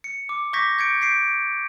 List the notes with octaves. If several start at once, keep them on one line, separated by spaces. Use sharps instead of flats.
C#7
D6
C#6 D6 G6 G#6 A#6 B6
G6 G#6 C#7 D7
G6 B6 C7 D7